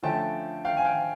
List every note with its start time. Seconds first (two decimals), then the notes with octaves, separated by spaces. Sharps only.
0.03 D3 F3 A3 C#4 F4 G5 A5
0.65 F5 G5
0.77 G#5
0.85 F5 G5